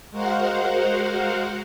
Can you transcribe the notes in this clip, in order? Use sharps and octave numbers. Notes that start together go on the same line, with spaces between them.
G#3 F#4 A#4 C5 F5 F#5